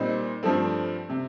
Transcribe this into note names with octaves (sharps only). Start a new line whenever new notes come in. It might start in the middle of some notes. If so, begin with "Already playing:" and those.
Already playing: A#2 G3 C4 D#4
G2 F3 A3 C4
C3